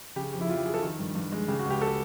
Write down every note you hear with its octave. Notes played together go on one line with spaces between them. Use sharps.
C#3 G4
F2 G4
E4
F2 F4
G4
F#3 G#4
A4
D#3
G2
G2
G#3
C#3 G4
F#4
C#2
G4
A4